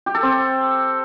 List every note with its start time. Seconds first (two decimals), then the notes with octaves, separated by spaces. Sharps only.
0.06 G4
0.15 A4
0.23 C4